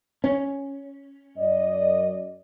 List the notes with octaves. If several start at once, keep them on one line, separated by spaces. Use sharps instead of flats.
C#4
F#2 D5 D#5